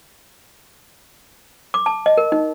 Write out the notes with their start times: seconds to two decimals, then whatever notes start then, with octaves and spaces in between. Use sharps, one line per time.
1.74 D6
1.86 A5
2.06 D#5
2.17 A#4
2.32 D#4